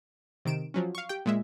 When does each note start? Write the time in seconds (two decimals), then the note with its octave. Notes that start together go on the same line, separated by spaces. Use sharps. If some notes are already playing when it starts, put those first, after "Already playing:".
0.45 C3 D#3 D7 E7
0.74 F3 F#3 C#4
0.95 F5 C#6
1.09 G4 G5
1.26 A#2 G#3 E5